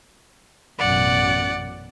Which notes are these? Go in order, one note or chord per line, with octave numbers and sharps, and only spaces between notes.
A1 F#2 B2 D5 F#5